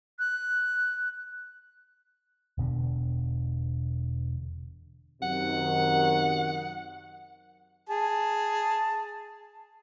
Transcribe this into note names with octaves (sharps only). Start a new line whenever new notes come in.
F#6
E1 B2 D3
F#2 C3 D#3 F#5
G#4 A5